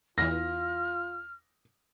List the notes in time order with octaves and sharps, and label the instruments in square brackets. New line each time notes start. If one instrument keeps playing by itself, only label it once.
[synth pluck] E2 E3 [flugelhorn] F4 [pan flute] F6 [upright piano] A#6